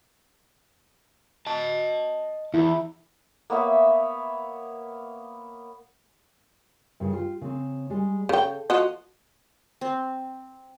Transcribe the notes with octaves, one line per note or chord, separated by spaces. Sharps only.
D#5 A5
E2 E4
A#3 B3 C#5 E5
G2 C#3 G#4
F4 G4
C#3 C4
G3 G#3
C#3 A4 G5
F3 F#4 D#5
C4